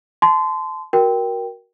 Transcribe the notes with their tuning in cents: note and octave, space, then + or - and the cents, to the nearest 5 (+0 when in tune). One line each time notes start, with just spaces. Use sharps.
A5 -20 C6 -25
F#4 +0 A#4 +15 G5 +0